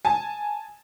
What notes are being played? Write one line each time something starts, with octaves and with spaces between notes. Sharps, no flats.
G#5 A5